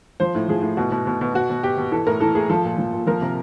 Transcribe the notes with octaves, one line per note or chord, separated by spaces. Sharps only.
F3 C5
A2
F3 G#4
A2
B2 F#4
B2
B2
B2
B2 F#4
B2
B2 G4
B2
E3 A4
A2 A#4
E3 A4
A2 G#4
F3 A4
A#2
F3
A#2
F3 A#4
C3